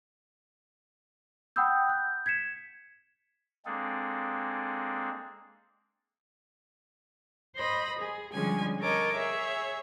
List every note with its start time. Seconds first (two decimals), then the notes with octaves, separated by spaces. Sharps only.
1.56 F#5 G5 B5 D#6 E6 G6
1.89 F#6 G6
2.26 G#6 B6 C#7 E7
3.66 G#3 A#3 C4 D4 G#4 A4
7.56 C5 D#5 B5 A#6
7.99 G#4
8.34 D3 F3 G3 G#3 C#4 G#5
8.80 A4 A#4 C#5 D#5 D6
9.15 G#4 C#5 E5